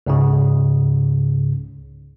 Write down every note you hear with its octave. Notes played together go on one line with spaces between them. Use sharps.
C#2 G#2 C#3